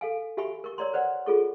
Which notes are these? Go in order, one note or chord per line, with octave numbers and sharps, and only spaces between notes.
A4 F5 G#5
F#4 G4 E5 G#5 B5 C#6
A#4 C#6
A#4 C#5 D5 A#5 C6
B4 C5 D5 F#5
F4 G#4 A4 C#6